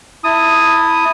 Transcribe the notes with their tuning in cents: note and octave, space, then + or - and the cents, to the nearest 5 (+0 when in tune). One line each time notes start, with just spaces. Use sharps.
E4 +0 A5 +30 D#6 +0